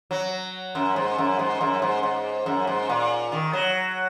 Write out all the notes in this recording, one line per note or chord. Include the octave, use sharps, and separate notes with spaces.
F#3
F#2
G#2
F#2
G#2
F#2
G#2
G#2
F#2
G#2
A#2
D#3
F#3